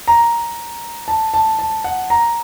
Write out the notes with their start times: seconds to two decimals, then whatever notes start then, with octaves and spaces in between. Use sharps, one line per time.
0.08 A#5
1.08 A5
1.34 A5
1.59 A5
1.84 F#5
2.10 A#5